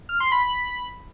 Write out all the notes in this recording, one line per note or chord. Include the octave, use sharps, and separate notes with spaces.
F6
C6
B5
B5